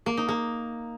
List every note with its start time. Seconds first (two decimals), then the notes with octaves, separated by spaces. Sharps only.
0.06 A#3
0.17 D#4
0.28 A#3